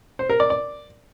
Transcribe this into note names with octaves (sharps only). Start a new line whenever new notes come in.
C5
A#4
D5
D5